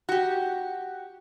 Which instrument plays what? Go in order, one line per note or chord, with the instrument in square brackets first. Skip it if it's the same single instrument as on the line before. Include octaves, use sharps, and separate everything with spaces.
[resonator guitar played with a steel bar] F#4 G4